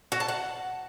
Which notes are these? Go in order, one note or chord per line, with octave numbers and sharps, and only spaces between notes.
F#4
A5
F#5